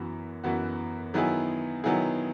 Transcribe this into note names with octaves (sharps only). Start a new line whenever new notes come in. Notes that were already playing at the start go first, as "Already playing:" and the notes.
Already playing: F#2 E3 B3 F#4
F#2 E3 B3 F#4
D#3 F#3 B3 E4 G#4
D#3 F#3 B3 E4 G#4